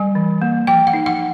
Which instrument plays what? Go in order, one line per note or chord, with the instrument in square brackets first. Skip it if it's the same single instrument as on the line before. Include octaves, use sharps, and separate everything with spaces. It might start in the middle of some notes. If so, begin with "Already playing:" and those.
Already playing: [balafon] G3 G#5
E3
A#3
F3 G5
F#5
D#4
F#5